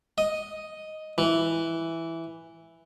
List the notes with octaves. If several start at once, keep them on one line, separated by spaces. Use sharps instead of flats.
D#5
E3